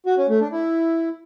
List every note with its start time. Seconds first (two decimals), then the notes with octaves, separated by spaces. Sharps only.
0.06 F#4
0.18 C#4
0.29 A3
0.40 D4
0.52 E4